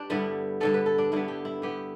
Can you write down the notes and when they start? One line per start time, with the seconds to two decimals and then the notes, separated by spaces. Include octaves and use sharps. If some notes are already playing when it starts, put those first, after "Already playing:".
Already playing: D4 G4 B4
0.10 G2 D3 G3 B3 E4
0.60 G2 D3 B3 A4
0.74 B4
0.86 A4
0.98 D4
1.12 G2 D3 B3 E4
1.28 G4
1.45 E4
1.62 D3 B3 G4